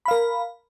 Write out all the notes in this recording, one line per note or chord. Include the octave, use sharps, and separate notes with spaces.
A#4 F5 B5